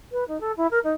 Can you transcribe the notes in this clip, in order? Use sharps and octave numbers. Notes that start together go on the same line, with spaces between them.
B4
D#4
A4
E4
A#4
D#4